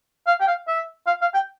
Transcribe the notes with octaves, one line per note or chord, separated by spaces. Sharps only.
F5
G5
F5
E5
F5
F5
G5